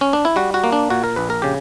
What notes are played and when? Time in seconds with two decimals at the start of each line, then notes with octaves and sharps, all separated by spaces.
0.01 C#4
0.13 D4
0.25 E4
0.36 G3 F#4
0.54 F#4
0.64 A#3
0.72 D4
0.90 A#2 F#4
1.04 A#4
1.16 A#1 B4
1.30 A#4
1.42 C#3 G4